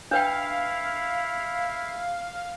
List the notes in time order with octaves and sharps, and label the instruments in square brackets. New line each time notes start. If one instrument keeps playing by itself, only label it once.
[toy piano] D4 B4 G5 [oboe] E4 [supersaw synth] F5